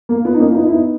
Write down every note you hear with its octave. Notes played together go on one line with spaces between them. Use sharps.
A#3
B3
D#4
A#3 C#4
E4
B3 D#4
E4
B3 D#4